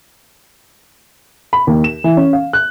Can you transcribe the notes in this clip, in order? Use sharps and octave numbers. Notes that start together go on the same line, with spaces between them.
B5
D#2
E7
E3
C#4
F5
F#6